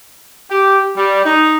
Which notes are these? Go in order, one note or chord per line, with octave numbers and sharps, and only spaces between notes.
G4
G3
D#4